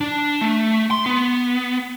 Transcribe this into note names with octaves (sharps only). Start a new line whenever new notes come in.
D4
A3
C6
B3